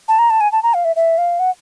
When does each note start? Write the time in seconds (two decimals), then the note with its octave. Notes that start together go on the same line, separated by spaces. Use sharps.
0.08 A5
0.19 A#5
0.30 A5
0.41 G#5
0.52 A5
0.63 A#5
0.74 F5
0.85 E5
0.96 E5
1.18 F5
1.39 F#5